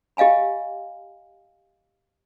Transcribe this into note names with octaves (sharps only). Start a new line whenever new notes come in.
G4 D#5 F5 G#5 B5